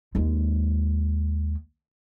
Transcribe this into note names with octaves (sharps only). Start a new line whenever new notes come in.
D#2 G#3